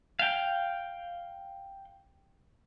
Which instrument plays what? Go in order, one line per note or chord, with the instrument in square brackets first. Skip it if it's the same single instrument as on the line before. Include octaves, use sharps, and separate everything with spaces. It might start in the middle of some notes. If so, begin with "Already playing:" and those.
[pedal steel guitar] F5 G5